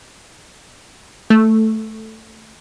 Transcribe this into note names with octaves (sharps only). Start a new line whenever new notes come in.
A3